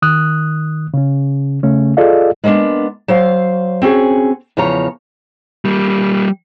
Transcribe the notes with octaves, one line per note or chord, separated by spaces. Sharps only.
D#3 D#6 F#6
C#3 C#4
C#3 A3 C#4
F4 G#4 A4 D5 D#5 F5
G#3 A#3 B3 C#4 D4
F#3 C5 F5
C4 C#4 F#4 G#4
E2 C#3 F3 C#5 A#5
G3 A#3